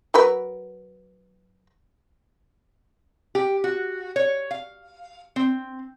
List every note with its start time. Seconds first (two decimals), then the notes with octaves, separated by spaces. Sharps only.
0.14 F#3 A#4 B4
3.35 G4
3.64 F#4
4.16 C#5
4.51 F5
5.36 C4